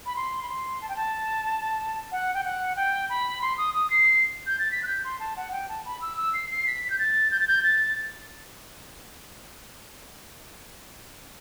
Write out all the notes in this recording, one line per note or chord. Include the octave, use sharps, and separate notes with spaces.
B5
C6
B5
C6
A5
G5
A5
F#5
G5
F#5
G5
B5
C6
D#6
D#6
C7
G6
A6
B6
F#6
G6
C6
A5
F#5
G5
A5
B5
E6
E6
C7
C7
B6
G6
A6
G6
A6
G6
A6